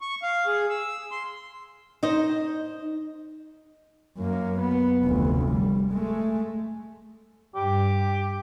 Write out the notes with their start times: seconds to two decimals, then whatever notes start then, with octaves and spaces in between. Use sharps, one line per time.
0.01 C#6
0.23 F5
0.46 G#4
0.69 E6
1.11 C6
2.03 D#4 C5 D#5
4.18 F#2 A#3
4.60 B3
5.03 F1 D2
5.51 G3
5.92 G#3 A3
7.55 G2 G4